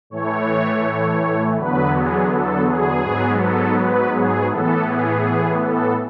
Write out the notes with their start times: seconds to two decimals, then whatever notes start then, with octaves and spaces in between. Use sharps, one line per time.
0.10 A2 E3 A3 C#5
1.56 E2 D3 F#3 B3 B4
1.94 G#4
2.29 A4
2.66 G#4
3.03 G#2 F#3 B3
3.39 A4
3.76 B4
4.12 G#4
4.49 A2 E3 B3 A4
4.86 G#4
5.59 A4